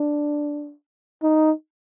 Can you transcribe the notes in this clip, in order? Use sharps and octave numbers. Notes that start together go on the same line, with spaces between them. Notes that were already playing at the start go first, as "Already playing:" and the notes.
Already playing: D4
D#4